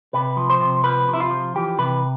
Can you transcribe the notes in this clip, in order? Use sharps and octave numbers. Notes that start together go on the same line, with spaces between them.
C3 B4
F3
C5
C3
F3 B4
C3
E4
F4
F3
E3 G4
C3 B4